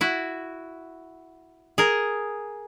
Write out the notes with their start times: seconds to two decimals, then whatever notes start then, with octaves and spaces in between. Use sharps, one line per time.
0.01 E4 F#4
1.78 G#4 A#4